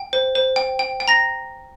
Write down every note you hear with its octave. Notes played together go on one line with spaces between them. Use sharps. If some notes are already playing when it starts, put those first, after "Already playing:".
Already playing: G5
C5
C5
G5
G5
G5
A#5 A#6